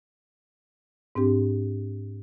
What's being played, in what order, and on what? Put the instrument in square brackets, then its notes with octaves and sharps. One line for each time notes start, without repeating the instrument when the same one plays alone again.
[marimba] G#2 C4 D4 G4